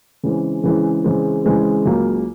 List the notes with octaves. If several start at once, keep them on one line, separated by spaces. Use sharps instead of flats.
C#3 E3 G#3 C4
C#3 E3 G#3 C4
C#3 E3 G#3 C4
C#3 E3 G#3 C4
C#2 C#3 F#3 A#3